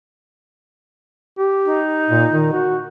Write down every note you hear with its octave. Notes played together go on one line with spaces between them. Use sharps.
G4
D#4
A#2
D#3
F#4